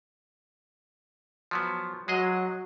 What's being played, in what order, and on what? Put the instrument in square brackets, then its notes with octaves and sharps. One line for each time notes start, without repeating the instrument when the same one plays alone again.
[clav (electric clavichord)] F3 F#3 B3
[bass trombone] F#3 [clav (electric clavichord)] G#3 G#4 D#5